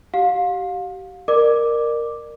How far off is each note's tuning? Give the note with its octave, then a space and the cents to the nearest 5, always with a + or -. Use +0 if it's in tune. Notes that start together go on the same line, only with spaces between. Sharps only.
G4 -35 F5 +30
A#4 +0 D5 +35 D6 +0